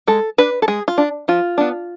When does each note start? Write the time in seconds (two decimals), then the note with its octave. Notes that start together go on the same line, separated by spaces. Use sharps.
0.08 G#3 A4
0.38 D4 B4
0.62 A4
0.68 G#3 G#4
0.88 F4
0.98 D4
1.28 F3 F4
1.58 B3 D4